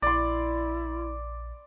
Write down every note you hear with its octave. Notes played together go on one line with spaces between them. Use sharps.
A#1 E4 D5 C6